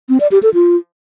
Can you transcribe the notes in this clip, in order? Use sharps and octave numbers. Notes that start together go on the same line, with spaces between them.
C4
D5
G4
A4
F4